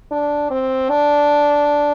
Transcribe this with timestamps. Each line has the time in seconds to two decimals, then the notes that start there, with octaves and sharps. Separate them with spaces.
0.11 D4
0.51 C4
0.89 D4